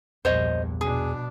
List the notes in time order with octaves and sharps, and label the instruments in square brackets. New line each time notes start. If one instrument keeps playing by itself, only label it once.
[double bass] A#1 G2 [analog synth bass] E2 [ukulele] C5 C#5 D#5
[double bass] B2 D4 [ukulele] G#4